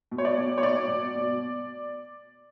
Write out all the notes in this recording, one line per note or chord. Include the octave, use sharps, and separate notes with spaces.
B2
C#5
D5
B2
C#5
B2 D5
B2
B2